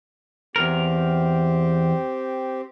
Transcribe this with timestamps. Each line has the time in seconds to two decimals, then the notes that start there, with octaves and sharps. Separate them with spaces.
0.56 E2 C4 G4 A#4